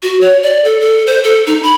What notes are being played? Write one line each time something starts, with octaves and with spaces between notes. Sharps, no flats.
F#4
C#5
D5
A4
A4
C5
A4
D#4
B5